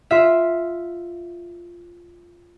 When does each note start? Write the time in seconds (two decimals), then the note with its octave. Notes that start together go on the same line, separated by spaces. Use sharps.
0.11 F4 E5